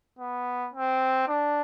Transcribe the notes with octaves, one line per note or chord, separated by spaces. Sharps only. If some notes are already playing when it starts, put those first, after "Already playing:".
B3
C4
D4